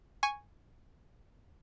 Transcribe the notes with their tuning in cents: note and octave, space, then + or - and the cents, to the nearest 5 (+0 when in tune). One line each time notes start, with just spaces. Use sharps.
G#5 -5 C#6 +0